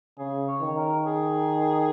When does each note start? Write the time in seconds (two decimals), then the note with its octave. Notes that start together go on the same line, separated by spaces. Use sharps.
0.18 C#3 G#4
0.48 C#5
0.62 D#3
0.77 A#4
1.06 G#4